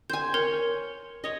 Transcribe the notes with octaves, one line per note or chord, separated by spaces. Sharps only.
C5 G#5 G6
A#4 C#5
C#5 D#5